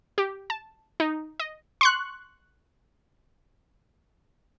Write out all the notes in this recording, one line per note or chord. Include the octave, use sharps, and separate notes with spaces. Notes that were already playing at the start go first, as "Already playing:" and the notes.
G4
A5
D#4
D#5
C6 C#6 F#6